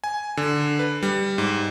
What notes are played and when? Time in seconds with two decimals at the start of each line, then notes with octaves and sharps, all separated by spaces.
0.04 G#5
0.37 D3
0.79 B4
1.03 G3
1.38 G#2